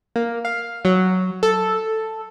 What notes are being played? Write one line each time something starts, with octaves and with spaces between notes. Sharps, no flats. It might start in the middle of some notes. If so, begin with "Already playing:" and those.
A#3
F5
F#3
A4